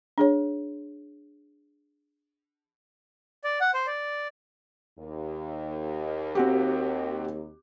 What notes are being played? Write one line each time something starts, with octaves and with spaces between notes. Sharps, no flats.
D4 G#4 C#5
D5
F#5
C5
D5
D#2
C4 F#4 G4